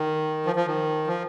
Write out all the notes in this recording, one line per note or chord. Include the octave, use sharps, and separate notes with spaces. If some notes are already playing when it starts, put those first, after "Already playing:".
Already playing: D#3
F3
F3
D#3
F3